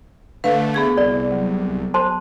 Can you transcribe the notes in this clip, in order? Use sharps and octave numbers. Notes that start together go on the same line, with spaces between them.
D3 A3 B4 F5
B3 G#4 G#6
C2 D5
F#3
C5 A5 C6